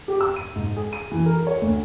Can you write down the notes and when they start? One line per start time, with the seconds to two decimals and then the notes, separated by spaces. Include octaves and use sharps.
0.08 G4
0.21 E6
0.36 D#7
0.56 G#2
0.76 G#4
0.93 D#7
1.11 E3
1.26 A#4
1.47 C#5
1.62 D2